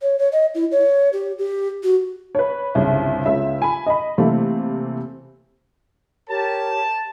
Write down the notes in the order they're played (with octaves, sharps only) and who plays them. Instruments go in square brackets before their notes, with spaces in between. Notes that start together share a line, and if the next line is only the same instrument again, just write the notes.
[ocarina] C#5
C#5
D#5
E4
C#5
G4
G4
F#4
[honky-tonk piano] B4 C#5
G1 C2 C#3
C#2 C#3 E5
G#5 B5
D#5 B5
C3 E3 A3 A#3
[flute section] G4 A#4 C#5 [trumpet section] A5